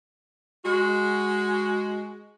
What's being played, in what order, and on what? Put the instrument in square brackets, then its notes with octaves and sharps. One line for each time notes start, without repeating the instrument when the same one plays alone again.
[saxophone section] G#3 F#4